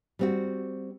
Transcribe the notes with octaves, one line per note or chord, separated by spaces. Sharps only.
G3 C4 F#4